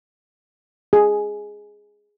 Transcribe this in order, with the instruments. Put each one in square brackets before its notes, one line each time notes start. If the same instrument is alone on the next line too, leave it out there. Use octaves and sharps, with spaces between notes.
[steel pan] G#4